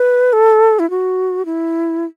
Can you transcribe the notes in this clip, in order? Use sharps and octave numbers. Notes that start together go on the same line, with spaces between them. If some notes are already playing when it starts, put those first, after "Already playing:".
Already playing: B4
A4
E4
F#4
E4